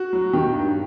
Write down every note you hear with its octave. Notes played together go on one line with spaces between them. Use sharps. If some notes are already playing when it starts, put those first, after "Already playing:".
Already playing: F#4
F#3
D#3 G4
G2